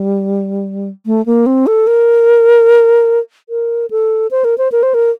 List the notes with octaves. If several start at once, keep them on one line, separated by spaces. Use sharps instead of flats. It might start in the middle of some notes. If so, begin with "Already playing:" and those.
Already playing: G3
A3
A#3
C4
A4
A#4
A#4
A4
C5
A#4
C5
A#4
C5
A#4